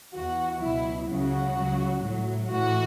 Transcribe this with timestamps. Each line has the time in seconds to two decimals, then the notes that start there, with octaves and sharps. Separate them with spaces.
0.14 E2 E3 F#4
0.62 C#2 B2 F#3 E4
1.09 C#2 C#3 F#3 F#4
1.57 C#2 C#3 F#3
2.04 A2 F#3
2.51 A2 E3 F#4